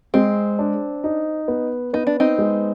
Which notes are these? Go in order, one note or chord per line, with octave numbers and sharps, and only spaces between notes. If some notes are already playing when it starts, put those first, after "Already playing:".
G#3 C4
D4
D#4
B3
B3 D#4
D4
C4 D#4
G#3